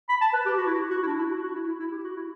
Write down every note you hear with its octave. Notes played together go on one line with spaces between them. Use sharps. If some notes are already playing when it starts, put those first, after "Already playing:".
B5
A5
B4
G4
F#4
E4
F#4
F#4
E4
D4
E4
F#4
F#4
E4
E4
E4
G4
F#4
E4